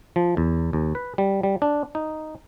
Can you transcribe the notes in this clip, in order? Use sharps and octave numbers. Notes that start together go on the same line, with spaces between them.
F3
E2
D#2
B4
G3
G3
D4
D#4